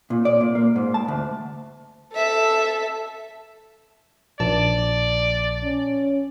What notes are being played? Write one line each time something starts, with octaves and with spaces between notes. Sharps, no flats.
A#2
D5
A#2
A#3
G#2
A5
D2
A4 E5
A#1 D5 A5
C#4